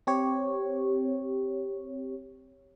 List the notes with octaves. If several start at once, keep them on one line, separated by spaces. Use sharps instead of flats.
C4 G4 C#5